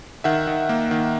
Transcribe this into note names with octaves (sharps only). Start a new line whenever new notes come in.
D#3 E5 F#5
D#3
A#3
D#3